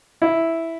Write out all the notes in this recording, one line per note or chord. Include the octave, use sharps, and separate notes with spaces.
E4